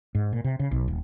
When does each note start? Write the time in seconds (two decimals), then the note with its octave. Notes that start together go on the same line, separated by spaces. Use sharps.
0.15 G#2
0.33 A#2
0.44 C3
0.60 C#3
0.71 B1
0.88 D#1